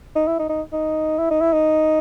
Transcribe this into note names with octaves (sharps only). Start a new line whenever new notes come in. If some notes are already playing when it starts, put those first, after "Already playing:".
D#4
E4
D#4
D#4
D#4
E4
D#4
E4
D#4